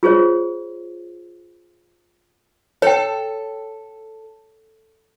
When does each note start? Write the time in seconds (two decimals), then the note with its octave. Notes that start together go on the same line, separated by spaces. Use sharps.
0.03 F4 G#4 C5 C#5
2.82 A4 C#5 G5